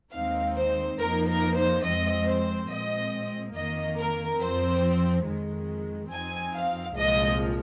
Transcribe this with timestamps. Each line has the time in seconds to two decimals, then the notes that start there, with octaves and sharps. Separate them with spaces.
0.12 D#2 D#3 G#3 C4 D#4 F5
0.56 C5
0.98 F2 F3 A#3 D#4 A#4
1.27 A#4
1.55 C5
1.84 F2 F3 G#3 C4 D#5
2.26 C5
2.69 A#2 G#3 C4 D#5
3.54 F2 D#3 A#3 D#5
3.97 A#4
4.40 F2 F3 C4 C5
5.25 F2 D#3 G#3
6.10 F2 F3 C4 D#4 G#5
6.54 F5
6.95 C2 A#2 F3 G#3 D#5